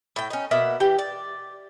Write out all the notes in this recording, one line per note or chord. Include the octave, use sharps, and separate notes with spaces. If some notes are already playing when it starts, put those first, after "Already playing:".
A2 G5
C#4 D#4
B2 A#3 E5 F#5
E3 G4 G5
D5